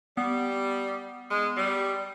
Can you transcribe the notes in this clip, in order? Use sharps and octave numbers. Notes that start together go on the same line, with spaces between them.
G3 B3
G#2 G#3
G3